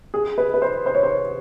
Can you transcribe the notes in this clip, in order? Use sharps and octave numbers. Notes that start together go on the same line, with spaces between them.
G#4
B4
B4
C5
C5
C#5
C5